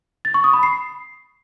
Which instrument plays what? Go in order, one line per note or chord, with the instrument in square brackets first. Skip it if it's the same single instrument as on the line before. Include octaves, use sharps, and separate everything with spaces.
[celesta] A6
C#6
D#6
B5
C7